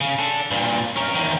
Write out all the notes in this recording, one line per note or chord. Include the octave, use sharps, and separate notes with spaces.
C#3
D4 A4
G2 A#2
C#4 A#4
E2 D#3